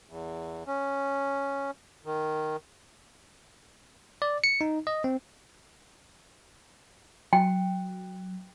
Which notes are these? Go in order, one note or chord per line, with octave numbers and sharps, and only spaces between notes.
E2
C#4
D#3
D5
C#7
D#4
D#5
C4
F#3 G5